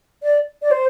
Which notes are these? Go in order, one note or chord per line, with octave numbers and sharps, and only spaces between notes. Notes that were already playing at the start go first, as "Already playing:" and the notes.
D5
D5
C5